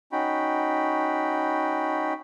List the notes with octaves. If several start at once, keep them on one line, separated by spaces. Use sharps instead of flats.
C#4 D#4 F#4 G5 B5